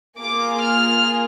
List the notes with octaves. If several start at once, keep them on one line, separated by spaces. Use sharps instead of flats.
A#3 F4 G#4 D6
F6